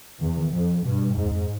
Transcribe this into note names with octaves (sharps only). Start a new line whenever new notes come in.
E2 D#3
E3
D#3
F2 F3
G2 B2
F2 G#2
E2
F2